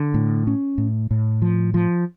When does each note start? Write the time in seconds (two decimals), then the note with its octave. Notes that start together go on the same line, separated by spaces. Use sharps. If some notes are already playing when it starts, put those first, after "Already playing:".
Already playing: D3
0.14 A2
0.47 C#4
0.78 A2
1.11 A2
1.42 F3
1.74 F3